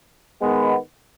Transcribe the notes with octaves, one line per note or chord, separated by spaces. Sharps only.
D#3 G#3 B3